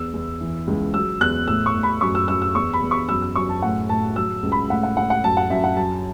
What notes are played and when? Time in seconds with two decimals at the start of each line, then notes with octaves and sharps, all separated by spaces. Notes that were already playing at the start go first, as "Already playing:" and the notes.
Already playing: E2 E6
0.13 E2
0.40 E3
0.67 C#2
0.94 F#3 E6
1.21 E2 F#6
1.47 A2 E6
1.66 C#6
1.74 A2
1.83 B5
2.01 F#2 C#6
2.15 E6
2.28 F#2 E6
2.42 E6
2.55 E2 C#6
2.73 B5
2.82 E2
2.91 C#6
3.09 F#2 E6
3.22 E6
3.35 F#2 C#6
3.49 A5
3.62 A2 F#5
3.89 A2 A5
4.16 F#3 E6
4.43 C#2
4.52 B5
4.70 A2 F#5
4.83 F#5
4.97 A2 F#5
5.10 F#5
5.24 F#2 A5
5.37 F#5
5.50 F#2 E5
5.64 F#5
5.77 F#3 A5